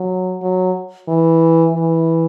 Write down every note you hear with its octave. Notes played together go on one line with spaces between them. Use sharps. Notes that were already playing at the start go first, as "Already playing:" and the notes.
Already playing: F#3
F#3
E3
E3